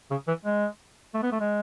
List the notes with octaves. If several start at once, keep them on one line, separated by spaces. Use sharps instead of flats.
C#3
E3
G#3
A3
B3
A3
G#3